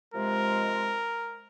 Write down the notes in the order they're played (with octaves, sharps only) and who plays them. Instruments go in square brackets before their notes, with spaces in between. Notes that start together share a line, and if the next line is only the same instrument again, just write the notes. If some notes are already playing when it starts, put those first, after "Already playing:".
[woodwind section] C3 F3 G#3 [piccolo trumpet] A#4